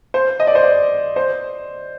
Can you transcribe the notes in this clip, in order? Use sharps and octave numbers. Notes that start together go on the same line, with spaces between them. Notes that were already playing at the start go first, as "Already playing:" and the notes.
C5
D#5
D5
C5
D5
C5